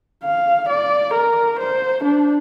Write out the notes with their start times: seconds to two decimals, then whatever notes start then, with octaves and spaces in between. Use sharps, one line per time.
0.24 F5
0.69 D5
1.14 A#4
1.59 C5
2.04 D4